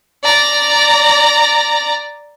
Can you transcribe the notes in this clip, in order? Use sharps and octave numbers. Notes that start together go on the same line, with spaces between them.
D5 A#5